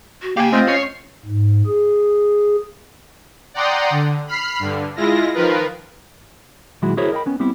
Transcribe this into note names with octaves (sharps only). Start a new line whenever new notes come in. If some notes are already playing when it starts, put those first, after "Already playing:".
F#4
A#3 G4 F5 G#5
A3 C4 F4 C5 D#5
C#4 C#5 C7
G#2
G#4
D5 F#5 G5 A#5 C6 D#6
D3
B5 F6 C7
G2 D3
G#3 E4 F4 A#6
D#3 F3 F4 A#4 B4
A#2 D#3 F#3 G#3 E4 F#4
E4 F#4 G#4 A#4 C5 C#5
A#4 D#5 F5 G5 B5
B3 C#4
G3 B3 C4 E4 E5